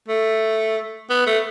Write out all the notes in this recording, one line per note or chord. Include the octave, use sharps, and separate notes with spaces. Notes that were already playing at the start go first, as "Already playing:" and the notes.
A3
B3
A3